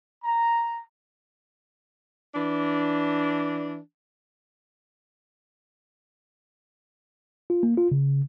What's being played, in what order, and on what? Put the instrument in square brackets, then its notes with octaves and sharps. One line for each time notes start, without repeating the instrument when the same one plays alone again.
[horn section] A#5
[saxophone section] E3 D4
[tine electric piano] F4
A#3
F4
C#3